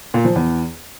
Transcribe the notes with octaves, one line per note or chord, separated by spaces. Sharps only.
A#2
F3
E2